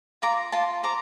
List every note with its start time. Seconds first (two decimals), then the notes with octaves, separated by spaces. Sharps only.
0.22 F4 A#5 D6
0.52 F4 A5 C6
0.83 C5 A#5 D6